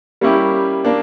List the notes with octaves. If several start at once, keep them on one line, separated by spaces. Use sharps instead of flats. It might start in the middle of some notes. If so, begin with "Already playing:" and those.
G3 A#3 C#4 E4 G4
A#3 D4